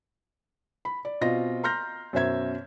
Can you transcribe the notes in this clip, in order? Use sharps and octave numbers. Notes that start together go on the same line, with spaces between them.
B5
D5
B2 C4 F4 D#5 A#6
A#5 C6 F6 G6 A#6
F#2 B2 C5 E5 G#6